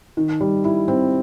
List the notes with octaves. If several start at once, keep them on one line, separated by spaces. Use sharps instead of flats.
D#3
G3
E4
C4